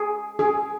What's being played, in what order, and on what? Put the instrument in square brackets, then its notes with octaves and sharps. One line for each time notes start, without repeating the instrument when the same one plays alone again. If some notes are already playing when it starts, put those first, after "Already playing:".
Already playing: [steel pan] G#4
G#4